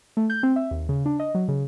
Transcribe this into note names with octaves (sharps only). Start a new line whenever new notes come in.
A3
G6
C4
E5
D#2
C#3
D4
D#5
F#3
C#3